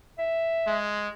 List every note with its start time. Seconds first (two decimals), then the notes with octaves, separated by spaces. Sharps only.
0.18 E5
0.67 G#3